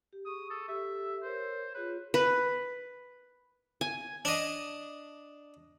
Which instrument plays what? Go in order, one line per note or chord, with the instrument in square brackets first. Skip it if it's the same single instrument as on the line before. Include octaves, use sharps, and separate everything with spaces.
[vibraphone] G4
[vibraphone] G#4 C#6 [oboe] D#6
[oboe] A4
[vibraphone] G4 A4 [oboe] E5
[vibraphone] A#4 C#5 [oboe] C5
[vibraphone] F4 G#4 C#5 [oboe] B4
[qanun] B4
G#5
[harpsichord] D4 D#5